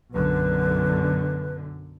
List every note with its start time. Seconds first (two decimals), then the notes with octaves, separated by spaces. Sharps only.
0.14 B1 F#2 D3 B4